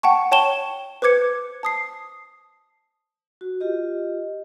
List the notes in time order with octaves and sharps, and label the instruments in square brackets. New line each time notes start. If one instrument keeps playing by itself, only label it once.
[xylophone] F#5 G5 A5 C#6
C#5 G5 A5 C#6 E7 G7
B4 C5 D6 G#6 C#7
A5 D#6 C7
[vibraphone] F#4
F4 G4 D#5